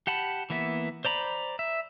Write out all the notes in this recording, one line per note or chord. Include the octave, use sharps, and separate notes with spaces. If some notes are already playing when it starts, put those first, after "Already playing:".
G4 F#5 A5 B5
E3 A#3 B3 E5
C5 D5 A#5 B5
E5